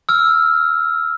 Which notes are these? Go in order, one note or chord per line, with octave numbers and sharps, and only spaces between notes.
E6 F6